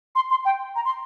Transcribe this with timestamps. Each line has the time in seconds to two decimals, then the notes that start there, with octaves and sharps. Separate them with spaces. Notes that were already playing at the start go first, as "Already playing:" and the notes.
0.15 C6
0.30 C6
0.45 G5
0.76 A#5
0.85 C6